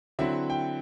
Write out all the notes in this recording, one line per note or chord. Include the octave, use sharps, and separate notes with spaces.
D3 F#3 C4 E4 E5
G5